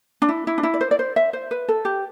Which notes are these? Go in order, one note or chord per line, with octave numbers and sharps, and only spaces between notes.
D4
E4
E4
D4
E4
D5
C5
D5
C5
E5
C5
B4
A4
G4